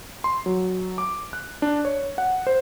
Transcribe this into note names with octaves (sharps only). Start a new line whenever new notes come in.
C6
F#3
D6
F#6
D4
C#5
F#5
C5